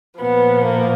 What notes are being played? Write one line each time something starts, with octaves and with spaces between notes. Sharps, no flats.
A#2 F3 B3
A#3